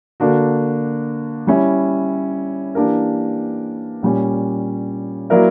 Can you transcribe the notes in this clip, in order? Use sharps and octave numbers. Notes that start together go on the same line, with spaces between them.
D3 A#3 D4 F#4
G3 C#4 E4
E3 A#3 D4 G4 A#4
A#2 G3 C#4
F#3 A#3 E4 A#4 D5